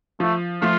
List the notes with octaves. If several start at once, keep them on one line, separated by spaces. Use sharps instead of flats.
F3 A3
F3 A3 F4